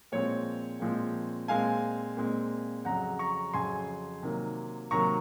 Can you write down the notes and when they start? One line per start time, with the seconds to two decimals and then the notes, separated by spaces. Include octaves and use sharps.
0.12 A#2 F3 G#3 C4 C#5
0.80 A#2 F3 G#3 C4
1.48 A#2 G#3 C4 F5 G#5
2.17 A#2 G#3 C4
2.85 F2 C#3 F#3 F#5 A#5
3.19 A#5 C#6
3.53 F2 C#3 F#3 G#5 C6
4.23 C3 D#3 F#3 A#3
4.91 C3 D#3 F#3 A#3 A#5 C#6